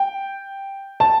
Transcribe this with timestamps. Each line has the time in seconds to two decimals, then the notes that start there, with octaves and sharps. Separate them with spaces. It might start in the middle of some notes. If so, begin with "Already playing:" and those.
Already playing: G5
1.00 A5